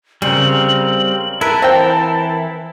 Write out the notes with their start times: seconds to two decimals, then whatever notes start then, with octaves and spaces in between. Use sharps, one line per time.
0.22 C#3 G3 C4 A#4 F#7
1.41 E4 A#4 B4 A5
1.62 E3 C4 E4 G5